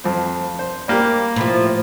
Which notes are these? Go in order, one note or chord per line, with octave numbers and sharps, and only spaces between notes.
F2 C4
C5
G3 A#3 G4
A2 F3